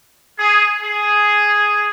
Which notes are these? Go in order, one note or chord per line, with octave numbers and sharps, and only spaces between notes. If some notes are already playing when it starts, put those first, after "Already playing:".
G#4
G#4